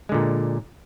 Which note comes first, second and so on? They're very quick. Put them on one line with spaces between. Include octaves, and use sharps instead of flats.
G#3 D3 A#2